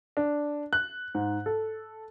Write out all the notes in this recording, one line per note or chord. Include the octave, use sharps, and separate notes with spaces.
D4
F#6
G#2
A4